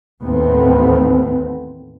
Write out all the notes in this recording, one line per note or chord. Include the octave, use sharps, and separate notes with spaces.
A1 D#2 A2 A3 B3 C4